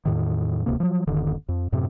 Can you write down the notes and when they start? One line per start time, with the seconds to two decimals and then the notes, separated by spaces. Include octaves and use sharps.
0.05 E2 A2 D#3
0.66 D#1 C#2 C3 A#3
0.80 F3 F#3
1.07 D#1 G2 D3 D#3
1.49 F2
1.72 F#2 A2 C3